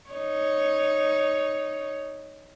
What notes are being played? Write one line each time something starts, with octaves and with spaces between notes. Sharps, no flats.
D#4 C#5